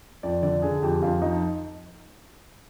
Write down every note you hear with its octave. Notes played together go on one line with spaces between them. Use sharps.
F2 D5
D3 D5
D3 G#4
F2 G4
F2 F4
F3 D#4